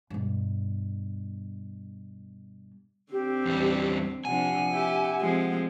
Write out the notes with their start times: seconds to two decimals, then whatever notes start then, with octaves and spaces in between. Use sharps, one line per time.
0.10 G2 B2
3.12 D3 C4 G4
3.45 E2 G3
4.25 C3 F3 D4 F#5 G#5
4.71 E4 G4
5.20 F3 G#3 C4